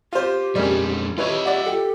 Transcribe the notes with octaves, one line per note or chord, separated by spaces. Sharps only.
F4 G4 C5
F2 G3 G#3 A#3 C#4
E4 F4 G4 B4 C#5 D#5
D5 E5 F#5
G4 A4